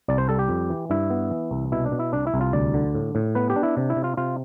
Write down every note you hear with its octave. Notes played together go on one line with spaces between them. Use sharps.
C2 D5
C5
G3 A4
G4
F2
E3
G2 E4
B3
E3
C2
B2 E4
D4
B2
E4
C2 D4
E4
C2
F4
D2 D5
D3
A2
A2
B3 B4
G4
D4
E4
C3
E4
C3
F4
C3 F4